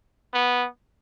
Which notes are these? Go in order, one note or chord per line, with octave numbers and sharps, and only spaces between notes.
B3